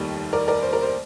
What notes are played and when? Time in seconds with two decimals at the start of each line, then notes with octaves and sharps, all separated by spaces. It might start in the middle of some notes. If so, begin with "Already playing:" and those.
Already playing: F1 D#2 D#3 G3
0.33 A#4 D5
0.48 A#4 D5
0.63 C5
0.73 A#4
0.82 C5